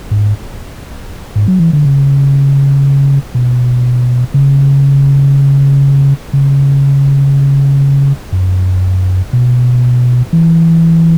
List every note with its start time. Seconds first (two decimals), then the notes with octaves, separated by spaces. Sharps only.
0.11 G#2
1.36 G#2
1.48 F#3
1.60 E3
1.73 D3
1.85 C#3
3.35 B2
4.34 C#3
6.33 C#3
8.32 F#2
9.33 B2
10.33 E3